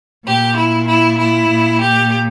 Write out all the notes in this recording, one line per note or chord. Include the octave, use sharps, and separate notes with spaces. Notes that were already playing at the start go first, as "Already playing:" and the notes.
A#2 G4
E4
E4
E4
A#2
G4